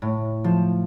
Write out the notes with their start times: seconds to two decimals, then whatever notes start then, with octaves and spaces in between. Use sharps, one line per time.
0.02 A2
0.44 F3